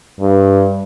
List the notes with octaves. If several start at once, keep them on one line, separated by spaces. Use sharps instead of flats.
G2